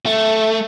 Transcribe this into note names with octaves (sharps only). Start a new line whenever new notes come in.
A3